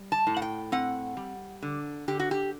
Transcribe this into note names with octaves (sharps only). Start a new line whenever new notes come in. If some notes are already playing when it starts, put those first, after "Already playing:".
Already playing: G3
A5
A2
F#5
G5
C4 F#5
G3
D3
D3 G4
F#4
G4